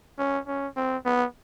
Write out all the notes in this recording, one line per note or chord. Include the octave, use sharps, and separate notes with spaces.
C#4
C#4
C4
B3